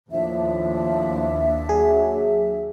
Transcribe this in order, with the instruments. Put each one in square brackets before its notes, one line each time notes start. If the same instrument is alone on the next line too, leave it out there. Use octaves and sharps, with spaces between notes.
[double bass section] D#2 [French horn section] A2 F3 [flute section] D4 E5
[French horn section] F#3 [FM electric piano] G#4